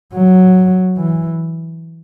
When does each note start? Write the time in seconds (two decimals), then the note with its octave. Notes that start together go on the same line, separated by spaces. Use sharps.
0.14 F#3
0.97 E3